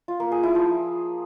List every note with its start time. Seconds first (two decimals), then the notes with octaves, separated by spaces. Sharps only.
0.08 F4
0.20 A#3
0.32 G#4
0.43 E4
0.55 F3